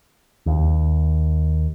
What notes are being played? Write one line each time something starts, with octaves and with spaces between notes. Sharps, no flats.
D#2